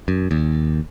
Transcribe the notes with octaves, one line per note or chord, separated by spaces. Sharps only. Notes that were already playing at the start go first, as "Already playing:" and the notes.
F#2
D#2